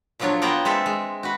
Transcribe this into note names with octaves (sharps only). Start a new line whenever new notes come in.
A#2 F3 F#3 D4 F4 C#5
A#3 B3 F4 A#4 F#5 G5
G#3 C4 A4 E5
G#3
F#4 B4